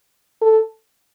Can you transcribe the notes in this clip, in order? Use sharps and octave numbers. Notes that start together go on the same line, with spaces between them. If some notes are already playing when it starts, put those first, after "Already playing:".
A4